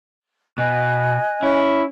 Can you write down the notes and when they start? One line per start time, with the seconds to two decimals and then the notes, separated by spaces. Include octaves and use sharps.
0.58 B2 D#5 G#5 F#6
1.43 C#4 E4